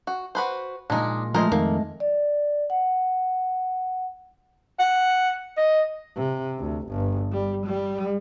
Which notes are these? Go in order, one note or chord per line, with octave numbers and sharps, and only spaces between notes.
F#4
F#4 B4 C5
A#2 G#3 D4 D#4
F3 G#3 A3 A#4 C5 D#5
F2 D#3 A#3
D5
F#5
F#5
D#5
C3
D2
G1
G3
G3